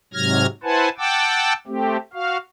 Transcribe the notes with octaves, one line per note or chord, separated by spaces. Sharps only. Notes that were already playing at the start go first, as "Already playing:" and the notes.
G#2 C3 F#3 F6 G#6 A#6
E4 B4 C5 F#5 G#5 A5
F#5 G5 A5 D6 E6
A3 C4 G4
F#4 F5